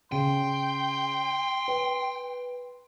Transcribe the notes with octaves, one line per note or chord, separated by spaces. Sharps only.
C#3 G5 C6
B4